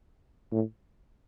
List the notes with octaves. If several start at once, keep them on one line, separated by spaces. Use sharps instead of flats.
A2